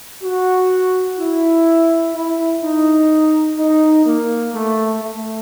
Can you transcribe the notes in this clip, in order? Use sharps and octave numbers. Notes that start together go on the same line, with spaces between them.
F#4
E4
E4
D#4
D#4
A#3
A3
A3